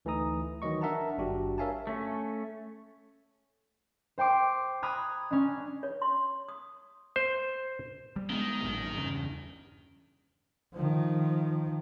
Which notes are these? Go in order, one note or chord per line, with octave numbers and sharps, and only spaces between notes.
D2 E3 A3 D#4 A#5 D#6
D#3 E3 F#3 D#5 C#6
D4 A#4 E5 F#5 A5 A#5
G#1 G2 D4 F#4 G4
A#4 C#5 E5 F5 G#5 A5
A3 C#4
C5 G5 C6 D6
A#5 B5 D#6 F6 F#6 G#6
C#4 D4
C#5
C6
D#6
C5
G3
D#3 G#3 A#3 B3
A1 F#2 A#2
E2 G2 C#3
D#3 F3